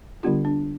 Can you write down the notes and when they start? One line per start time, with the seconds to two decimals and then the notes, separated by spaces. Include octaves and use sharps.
0.23 D3 G3 B3 D4 F4 G4
0.45 D4